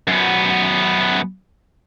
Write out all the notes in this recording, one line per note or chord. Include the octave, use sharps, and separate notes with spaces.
F#2 B3